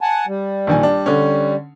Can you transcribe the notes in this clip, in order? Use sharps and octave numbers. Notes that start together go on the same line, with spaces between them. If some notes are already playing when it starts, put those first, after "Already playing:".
F#5 G#5 A5
G3
A#1 D#3 G#5
D4
D3 C#4